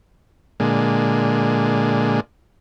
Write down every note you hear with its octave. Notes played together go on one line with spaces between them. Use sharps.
A#2 D3 G#3